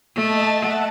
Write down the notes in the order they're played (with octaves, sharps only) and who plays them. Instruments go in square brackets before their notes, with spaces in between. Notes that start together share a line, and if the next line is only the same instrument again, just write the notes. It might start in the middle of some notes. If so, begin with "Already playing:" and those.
[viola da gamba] A3 [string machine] D#5 A5 A6
[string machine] E5 F#5 A5